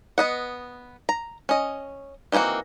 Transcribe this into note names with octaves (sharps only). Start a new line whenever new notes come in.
B3 D#5 F#5
A#5
C#4 D#5
D#3 E3 A#3 C4 F#4